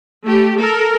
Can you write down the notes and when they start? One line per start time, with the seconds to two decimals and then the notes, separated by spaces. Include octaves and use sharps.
0.25 A3 G4
0.59 A4 A#4